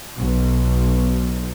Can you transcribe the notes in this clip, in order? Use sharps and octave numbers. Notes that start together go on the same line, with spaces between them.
B1 B2